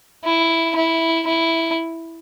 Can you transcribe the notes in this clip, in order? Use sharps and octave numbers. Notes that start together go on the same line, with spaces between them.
E4
E4
E4